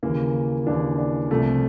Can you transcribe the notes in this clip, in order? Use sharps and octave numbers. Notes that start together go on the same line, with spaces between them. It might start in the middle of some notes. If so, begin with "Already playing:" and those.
D#2 C#3 E3 A#3
D#2 C#3 E3 D4
D4
C2 C3 F3 A3